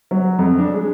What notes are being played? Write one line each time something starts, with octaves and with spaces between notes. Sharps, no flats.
F#3
F2
D4
G#3